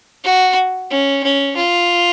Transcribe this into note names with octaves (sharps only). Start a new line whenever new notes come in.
F#4
C#4
C#4
F4